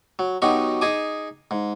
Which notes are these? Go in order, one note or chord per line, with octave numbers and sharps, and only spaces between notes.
F#3
B2 F#3 D#4 G4 C#6
D#4 G#4 G#5 D6
G#2